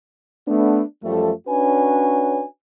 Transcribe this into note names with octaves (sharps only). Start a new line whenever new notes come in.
A3 B3 D4
F#2 F3 G3 A3
C#4 D4 F#4 B4 C#5 G#5